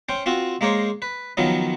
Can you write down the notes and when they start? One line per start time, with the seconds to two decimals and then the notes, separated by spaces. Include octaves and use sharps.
0.09 C#4 C5 G5
0.26 C4 F4 F#4
0.61 G#3 A#3 A#4 C5 C#5
1.02 B4
1.37 D#3 F3 F#3 B3 C#4